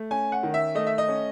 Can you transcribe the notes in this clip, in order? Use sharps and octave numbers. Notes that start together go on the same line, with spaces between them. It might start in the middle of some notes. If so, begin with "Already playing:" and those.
Already playing: A3
C#4 G#5
F#5
D#3
E5
A3 D#5
E5
D#5
C#4